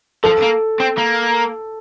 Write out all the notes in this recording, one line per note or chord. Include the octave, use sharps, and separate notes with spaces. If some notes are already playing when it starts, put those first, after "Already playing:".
F3 A4
A#3
C4
A#3